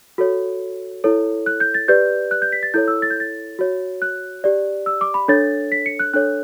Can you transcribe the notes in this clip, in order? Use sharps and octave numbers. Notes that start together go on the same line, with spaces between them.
F#4 A4 C#5
E4 A4 C#5
F#6
G6
A6
G4 B4 D5 G6
F#6
G6
B6
A6
E4 A4 C#5 G6
E6
A6
G6
A6
F#4 C#5
F#6
G4 D5
E6
D6
B5
D4 A4 C#5 A6
B6
C#7
F#6
D4 A4 C#5 F#6